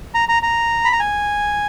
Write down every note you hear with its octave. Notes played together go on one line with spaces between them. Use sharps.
A#5
A#5
A#5
B5
A#5
G#5